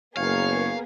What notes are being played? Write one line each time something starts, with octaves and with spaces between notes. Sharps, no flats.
F#1 A#3 B3 G#4 C#5 F5